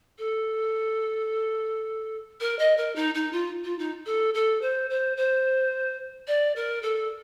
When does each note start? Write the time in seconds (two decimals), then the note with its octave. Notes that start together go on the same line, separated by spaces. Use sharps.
0.19 A4
2.40 A#4
2.59 D#5
2.77 A#4
2.96 D#4
3.15 D#4
3.33 F4
3.64 F4
3.79 D#4
4.06 A4
4.34 A4
4.62 C5
4.90 C5
5.17 C5
6.27 D5
6.56 A#4
6.83 A4